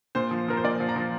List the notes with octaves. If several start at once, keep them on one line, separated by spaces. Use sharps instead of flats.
A#2 C5
F3
F3 A#4
C5
A#2 D5
F3
A#5
F3